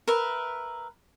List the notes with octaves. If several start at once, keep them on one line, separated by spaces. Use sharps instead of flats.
A#4 B4 E5